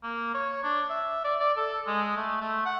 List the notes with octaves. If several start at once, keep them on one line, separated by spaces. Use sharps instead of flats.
A#3
C#5
D4
E5
D5
D5
A4
G#3
A3
A3
F#5